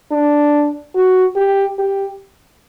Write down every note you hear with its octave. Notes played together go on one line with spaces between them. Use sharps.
D4
F#4
G4
G4